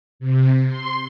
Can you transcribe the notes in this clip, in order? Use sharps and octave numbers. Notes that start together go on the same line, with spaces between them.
C3
C6